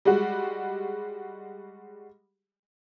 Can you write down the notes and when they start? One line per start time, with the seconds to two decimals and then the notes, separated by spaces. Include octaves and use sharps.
0.05 G3 G#3 F#4